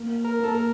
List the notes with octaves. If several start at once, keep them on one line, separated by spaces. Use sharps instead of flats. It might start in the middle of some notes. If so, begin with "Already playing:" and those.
Already playing: A#3
A#4
A#3 A4
A#4